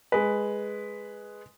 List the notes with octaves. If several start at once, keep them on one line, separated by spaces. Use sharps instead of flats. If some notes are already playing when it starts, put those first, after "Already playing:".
G#3 B4